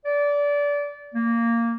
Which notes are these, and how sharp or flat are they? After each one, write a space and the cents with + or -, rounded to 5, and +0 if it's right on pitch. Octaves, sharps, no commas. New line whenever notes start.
D5 -25
A#3 -10